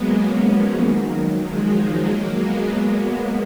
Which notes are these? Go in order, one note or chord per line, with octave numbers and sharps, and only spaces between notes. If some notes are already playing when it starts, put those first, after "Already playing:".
Already playing: F#3 G#3 A#3 B3
A#3 C#4
F3 G#3
D#3 F#3
F3 G#3
F3 G#3
F#3 A#3
G#3 B3